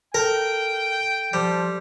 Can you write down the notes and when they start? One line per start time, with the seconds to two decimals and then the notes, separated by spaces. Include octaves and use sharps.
0.14 A4 A#4 G5
1.33 F3 G3